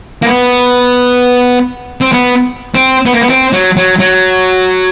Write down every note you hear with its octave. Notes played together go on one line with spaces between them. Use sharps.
A#3
B3
C4
B3
C4
B3
A#3
B3
C4
F#3
F#3
F#3